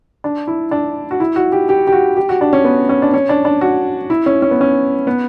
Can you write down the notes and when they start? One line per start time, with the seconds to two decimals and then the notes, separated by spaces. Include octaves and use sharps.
0.24 D4
0.47 E4
0.71 D4
1.11 F#4
1.20 E4
1.36 F#4
1.52 G4
1.69 G4
1.87 G4
1.92 F#4
2.17 G4
2.29 F#4
2.41 D4
2.53 C#4
2.64 B3
2.89 C#4
3.02 D4
3.14 C#4
3.29 D4
3.45 D4
3.61 F#4
4.10 E4
4.26 C#4
4.42 C#4
4.51 B3
4.61 C#4
5.07 B3